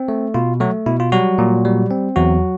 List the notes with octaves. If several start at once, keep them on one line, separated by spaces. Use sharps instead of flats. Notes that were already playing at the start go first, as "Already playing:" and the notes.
Already playing: C4
A3
B2 F4
F#3 A3 F#4
B2 E4
F4
F#3 G3 F#4
A#2
G3
C4
E2 F#3 F#4